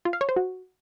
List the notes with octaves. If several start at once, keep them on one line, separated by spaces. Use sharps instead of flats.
F4
F5
C#5
C5
F#4